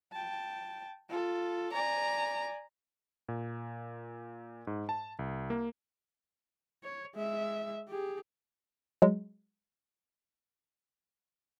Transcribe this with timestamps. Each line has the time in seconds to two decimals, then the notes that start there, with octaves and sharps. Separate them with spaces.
0.12 G5 A5
1.09 F4 A4
1.73 D5 G#5 A#5
3.29 A#2
4.67 G#2
4.89 A5
5.19 C2
5.50 A#3
6.84 C#5
7.15 G#3 E5
7.89 G4 G#4
9.02 F#3 G#3